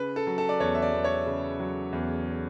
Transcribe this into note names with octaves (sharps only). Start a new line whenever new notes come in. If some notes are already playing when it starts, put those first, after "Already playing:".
Already playing: C#3 B4
A4
F#3
A4
D5
E2 C#5
E5
D5
E2
C#5
C#3
F#3
E2